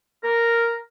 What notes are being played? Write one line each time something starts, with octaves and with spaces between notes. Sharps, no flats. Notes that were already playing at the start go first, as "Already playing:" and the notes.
A#4